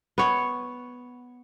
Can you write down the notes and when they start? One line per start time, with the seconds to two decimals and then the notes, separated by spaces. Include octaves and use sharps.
0.18 B3 C#5